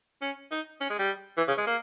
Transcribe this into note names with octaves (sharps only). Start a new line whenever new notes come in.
C#4
D#4
C#4
G#3
G3
E3
C#3
G#3
A#3